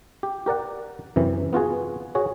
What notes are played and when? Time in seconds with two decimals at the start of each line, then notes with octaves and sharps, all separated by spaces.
0.23 G4
0.46 G4 A#4 D5 F#5
1.16 F#2 C3 E3
1.53 B3 F4 F#4 G#4
2.15 F#4 G#4 C#5